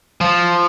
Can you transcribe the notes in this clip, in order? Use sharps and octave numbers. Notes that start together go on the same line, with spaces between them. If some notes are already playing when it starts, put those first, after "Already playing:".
F3